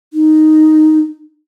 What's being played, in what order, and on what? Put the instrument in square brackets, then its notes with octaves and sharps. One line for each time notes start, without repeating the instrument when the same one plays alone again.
[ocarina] D#4